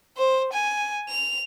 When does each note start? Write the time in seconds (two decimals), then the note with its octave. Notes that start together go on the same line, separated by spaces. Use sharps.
0.17 C5
0.53 G#5
1.09 F7